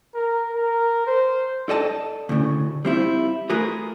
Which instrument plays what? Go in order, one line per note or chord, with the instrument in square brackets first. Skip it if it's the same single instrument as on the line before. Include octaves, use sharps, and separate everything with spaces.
[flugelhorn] A#4
A#4
C5
[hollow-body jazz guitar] A4 D5 D#5 G5 A5
D2 A2 C#3
G3 C4 E4 F4
A3 F4 F#4 G#4 A#4 B4